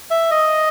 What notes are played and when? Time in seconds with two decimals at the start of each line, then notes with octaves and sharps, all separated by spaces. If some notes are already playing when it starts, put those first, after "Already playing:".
0.11 E5
0.31 D#5